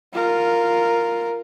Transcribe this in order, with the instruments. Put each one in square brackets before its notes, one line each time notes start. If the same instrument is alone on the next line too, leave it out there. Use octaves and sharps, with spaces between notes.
[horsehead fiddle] F4 A#4